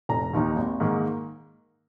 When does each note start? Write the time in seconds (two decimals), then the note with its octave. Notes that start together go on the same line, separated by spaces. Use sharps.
0.09 F1 A#5
0.33 D#2 D#3 A#3 D#4
0.57 G#1
0.80 G#2 D#3 A#3